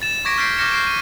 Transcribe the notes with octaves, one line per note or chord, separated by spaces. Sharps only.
A6 E7
C#6 D6 G#6 A#6 B6 D7
F6 G6 A6 B6 C7 D7
D6 F6 G6 A#6 C#7 E7
F#6 G6 A#6 C7 D7
D#7